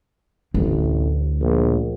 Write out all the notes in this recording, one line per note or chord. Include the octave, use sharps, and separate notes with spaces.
A1 D2
A#1